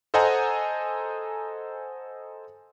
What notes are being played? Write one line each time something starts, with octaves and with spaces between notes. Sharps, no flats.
A4 C5 D#5 F#5 G#5 A#5